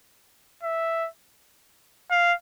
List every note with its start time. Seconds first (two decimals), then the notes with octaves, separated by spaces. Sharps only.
0.64 E5
2.11 F5